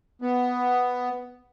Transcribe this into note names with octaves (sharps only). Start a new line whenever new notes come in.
B3